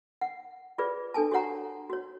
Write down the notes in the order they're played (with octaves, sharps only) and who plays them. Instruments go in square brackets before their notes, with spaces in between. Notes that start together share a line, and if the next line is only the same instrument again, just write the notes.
[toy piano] F#5
F4 G#4 B4 D5
D4 A4 G#5 A5
F#4 G4 C#5 F#5 A#5
F#4 C#5